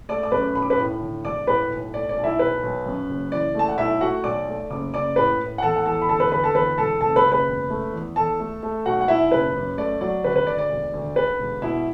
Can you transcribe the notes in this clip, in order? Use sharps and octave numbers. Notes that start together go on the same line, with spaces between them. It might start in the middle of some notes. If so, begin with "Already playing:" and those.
A3 D5 D6
D6
F#2 B4 B5
B1 B5
D6
B4 B5
A2
D3
E1 D5 D6
A2 B4 B5
B1
A3 D5
D5
B1
E4 E5
B1 B4
B1
F#2
F#1
E3 D5
A3 A5
F#5
B1 E4 E5
A3 F#4 F#5
B1 D5 D6
A3
F#1 D6
F#1 D5 D6
A2 B4 B5
A2
F#5
E2 A4 A5
F#5
E2 A4 A5
B5
D2 A4 A5
B4 B5
D2 B4 B5
A4 A5
E2 B4 B5
E1 A4 A5
F#1 A4 A5
B4 B5
F#1
B4 B5
E1
A3
E2
E2 A4 A5
A3
A3
B1 F#4 F#5
F#5
B1 E4 E5
F#1 B4
F#2
A3 D5
F#3 D5
D2 B4
B4
D2 D5
D5
E1
D2
D3 B4
E1
B2 E4 E5